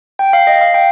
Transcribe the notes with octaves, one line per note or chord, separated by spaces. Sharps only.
G5
F5
D#5
F5
G5